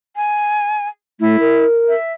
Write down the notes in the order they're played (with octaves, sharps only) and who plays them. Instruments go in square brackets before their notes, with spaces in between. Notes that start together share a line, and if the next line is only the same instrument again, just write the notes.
[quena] G#5
[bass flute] A3 [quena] E4
[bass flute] A#4
[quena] E5